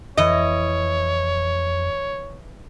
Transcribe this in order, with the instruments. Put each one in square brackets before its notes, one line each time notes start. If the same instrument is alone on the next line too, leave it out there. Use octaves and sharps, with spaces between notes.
[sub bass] F2 [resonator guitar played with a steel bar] E3 D#5 [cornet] C#5